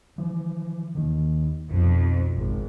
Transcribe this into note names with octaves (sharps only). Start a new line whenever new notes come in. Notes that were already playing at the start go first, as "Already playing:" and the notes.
E3 F3
D#2 D#3
B1 F2 B2
G#1